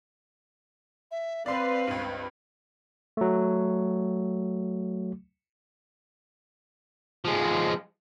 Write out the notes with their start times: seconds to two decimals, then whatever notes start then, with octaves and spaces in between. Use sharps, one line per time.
1.11 E5
1.46 C4 B4 D5 F5 C6
1.87 C#2 G2
3.17 F#3 A3
7.25 F3 G#3